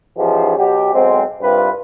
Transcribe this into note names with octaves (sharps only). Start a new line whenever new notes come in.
G#2 E3 F3 C#4 G4 G#4
B2 F#3 F#4 G4
B1 G#3 C4
C2 G2 G3 C4 F4 B4